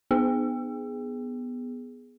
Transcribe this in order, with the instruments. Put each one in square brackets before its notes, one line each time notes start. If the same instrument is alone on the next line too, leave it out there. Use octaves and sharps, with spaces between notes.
[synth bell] B3 G#4